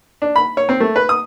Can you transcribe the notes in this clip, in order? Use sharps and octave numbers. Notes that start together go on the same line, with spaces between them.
D4
B5
C#5
C4
A3
B4
D#6